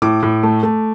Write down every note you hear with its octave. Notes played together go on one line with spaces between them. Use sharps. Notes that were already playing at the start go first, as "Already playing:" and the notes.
A2 D6
A2
A3
A3